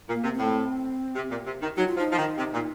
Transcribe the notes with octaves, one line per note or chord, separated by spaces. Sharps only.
A#2
A#3
C3
A2 C4
C3
A#2
C3
D#3
F#3 D#4
F4
F3 D#4
F3
D#3
C3
A#2